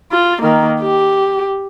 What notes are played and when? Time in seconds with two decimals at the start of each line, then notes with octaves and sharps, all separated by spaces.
0.12 F4
0.42 D#3 A#3
0.81 G4